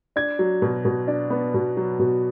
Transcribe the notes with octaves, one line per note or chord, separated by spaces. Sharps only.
D4 G#6
F#3
B2
B2
D4
B3
B2
F#3
B2